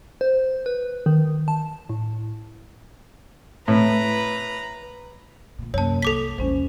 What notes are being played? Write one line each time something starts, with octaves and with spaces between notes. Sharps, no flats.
C5
B4
D#3
A5
A2
A2 B4 A#5
D2 A#2
F#2 C3 A#3 C#5 A5
C2 A4 D6 B6
A#1 E2 G#3 C#4 C5